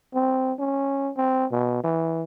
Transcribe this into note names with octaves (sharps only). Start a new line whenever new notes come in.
C4
C#4
C4
B2
E3